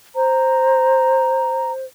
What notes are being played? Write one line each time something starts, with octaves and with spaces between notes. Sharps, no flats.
C5 A#5